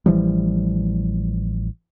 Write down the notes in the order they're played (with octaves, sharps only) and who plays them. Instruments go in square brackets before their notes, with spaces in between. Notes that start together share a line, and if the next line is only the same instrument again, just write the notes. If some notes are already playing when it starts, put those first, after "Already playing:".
[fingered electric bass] A1 E3 F3 G3